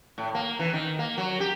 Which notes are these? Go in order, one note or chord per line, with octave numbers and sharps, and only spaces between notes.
A2
A#3
E3
D#3
A#3
F#3
G4